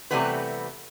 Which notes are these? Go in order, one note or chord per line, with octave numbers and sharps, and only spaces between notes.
C3 E3 G3 A3 B3 B4